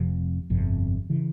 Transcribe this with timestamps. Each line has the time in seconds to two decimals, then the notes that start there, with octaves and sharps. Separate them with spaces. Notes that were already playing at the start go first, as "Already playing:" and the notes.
Already playing: F1 F2 C3 F3
0.50 G1 F2 C3
1.10 C#3 E3